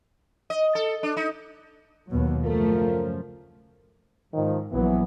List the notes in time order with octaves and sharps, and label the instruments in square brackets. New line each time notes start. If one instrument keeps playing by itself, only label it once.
[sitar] D#5
A4
D4
D#4
[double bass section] D#2 B2 F#3
[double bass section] F#2 C#3 F3 [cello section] A3 [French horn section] F4 A4 A#4
[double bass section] G#2 [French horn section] D#3 F3
[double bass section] A#1 F#3 [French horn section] E3 B3